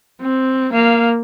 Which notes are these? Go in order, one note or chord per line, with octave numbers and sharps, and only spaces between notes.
C4
A#3 F5